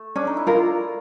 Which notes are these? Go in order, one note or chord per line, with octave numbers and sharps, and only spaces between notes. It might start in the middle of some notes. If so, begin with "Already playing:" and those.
Already playing: A3
C#4 D4
D#4
E4
F4 A#4